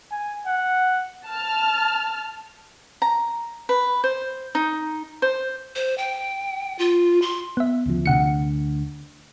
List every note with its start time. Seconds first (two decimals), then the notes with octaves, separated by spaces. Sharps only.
0.11 G#5
0.46 F#5
1.28 A5 F6
3.02 A#5
3.69 B4
4.04 C5
4.55 D#4
5.22 C5
5.76 C5
5.98 G5
6.79 F4
7.22 C6
7.57 B3 E5
7.86 D2 C#3 F3
8.06 D2 C3 F#5 C#7